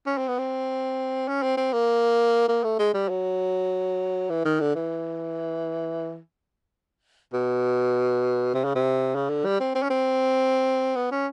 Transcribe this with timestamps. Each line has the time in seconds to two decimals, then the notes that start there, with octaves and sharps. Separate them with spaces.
0.07 C#4
0.18 C4
0.28 B3
0.38 C4
1.28 C#4
1.42 C4
1.57 C4
1.73 A#3
2.48 A#3
2.64 A3
2.79 G#3
2.94 G3
3.09 F#3
4.30 E3
4.45 D#3
4.60 D3
4.75 E3
7.33 B2
8.54 C3
8.64 C#3
8.75 C3
9.15 C#3
9.29 D3
9.45 G3
9.60 C4
9.75 C4
9.82 C#4
9.90 C4
10.96 B3
11.11 C#4